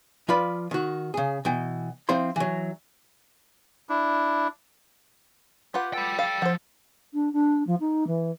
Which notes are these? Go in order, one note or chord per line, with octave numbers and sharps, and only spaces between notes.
F3 F4 B4 D5 B5
D#3 F#4
C#3 G#4
B2 E3 G5
F3 C4 E4 C5 C6
E3 F#3
D4 E4
F4 G4 B4 F#5
A4 G5 B5
A4 F5
F3 C5 F#5
D4
D4
F3
D#4
E3